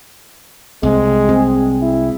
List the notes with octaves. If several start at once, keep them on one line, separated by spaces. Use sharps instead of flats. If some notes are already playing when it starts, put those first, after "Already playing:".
C2 G#3 C4
C4 G#4
E4